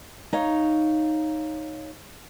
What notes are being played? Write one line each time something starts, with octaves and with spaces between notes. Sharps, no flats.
D#4 C#5 F5